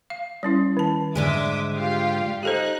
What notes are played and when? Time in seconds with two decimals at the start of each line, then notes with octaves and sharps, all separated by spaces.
0.10 F5
0.43 G3 C#4 E4
0.77 D#3 A5
1.15 G#2 D3 G#3 E5 D6 D#6
1.76 F4 G4 F5
2.43 D#4 G4 A4 C5 F#6